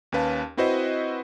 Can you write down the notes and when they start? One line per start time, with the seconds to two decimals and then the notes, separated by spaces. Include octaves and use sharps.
0.12 D#2 C#4 B4 F5 A5
0.57 C4 E4 F#4 B4 C5 D#5